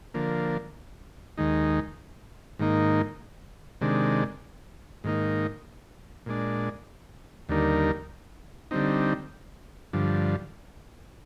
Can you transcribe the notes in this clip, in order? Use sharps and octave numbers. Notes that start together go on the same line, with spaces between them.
D3 F3 A#3
D#2 D#3 G#3 D#4
G#2 D#3 A#3 D#4
C3 D#3 G#3 D4
G#2 D#3 A#3 D#4
A#2 G#3 D4
D#2 D3 G3 A#3 D#4
D3 G3 C4 D#4
G2 D3 F3